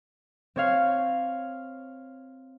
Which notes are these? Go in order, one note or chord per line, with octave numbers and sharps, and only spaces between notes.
C4 C#5 F5